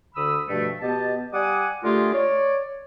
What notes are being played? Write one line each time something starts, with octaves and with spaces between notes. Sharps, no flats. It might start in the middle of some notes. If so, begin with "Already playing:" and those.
D2 D3 B5 D#6 E6
G2 B2 F3 A3
B2 B3 G4 D#5 A5
G3 D5 F#5 G#5 D6 D#6
D3 A3 F4 G4 G#4 A#4
C#5 D5